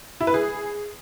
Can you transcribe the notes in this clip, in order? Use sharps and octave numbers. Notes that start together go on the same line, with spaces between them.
E4
B4
G#4